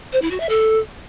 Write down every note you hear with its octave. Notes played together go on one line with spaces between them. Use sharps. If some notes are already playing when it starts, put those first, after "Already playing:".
C5
E4
F#4
E5
A4